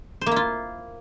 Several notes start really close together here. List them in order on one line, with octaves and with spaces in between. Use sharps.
C5 A#3 E4 F4